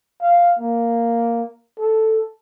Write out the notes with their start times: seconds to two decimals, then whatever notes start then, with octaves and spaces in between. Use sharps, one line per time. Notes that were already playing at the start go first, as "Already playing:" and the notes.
0.22 F5
0.59 A#3
1.79 A4